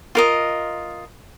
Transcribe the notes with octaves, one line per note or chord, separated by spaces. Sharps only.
F4 A#4 D#5